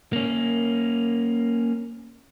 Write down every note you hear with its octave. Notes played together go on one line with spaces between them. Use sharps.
A#3 C#4